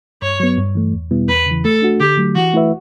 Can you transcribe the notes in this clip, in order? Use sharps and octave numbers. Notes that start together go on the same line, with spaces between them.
G2 C#5
F#3 B3
G2
E3 A3
E2
B2 G3 B3 E4
E2 B4
C#3
E3
A3 A4
D4 F#4
D3 G4
F#3 A3
E3 F#4
A3 E4 B4 E5